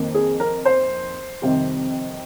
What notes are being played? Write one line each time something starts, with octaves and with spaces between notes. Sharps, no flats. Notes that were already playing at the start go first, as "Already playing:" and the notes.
Already playing: F2 D#3 A#3
G#4
A#4
C5
F2 C3 D#3 G3